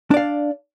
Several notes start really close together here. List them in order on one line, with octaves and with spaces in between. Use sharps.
D4 D5 F5